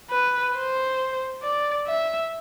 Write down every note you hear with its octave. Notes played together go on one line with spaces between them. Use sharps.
B4
C5
D5
E5